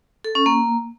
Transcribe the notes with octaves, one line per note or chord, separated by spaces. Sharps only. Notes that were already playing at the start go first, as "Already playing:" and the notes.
A4
C#4
A#3